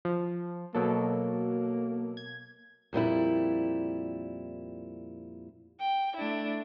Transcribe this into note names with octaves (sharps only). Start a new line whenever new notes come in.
F3
B2 F#3 A#3 A4
G#6
F2 A#2 G3 E4
G5
A3 D4 E4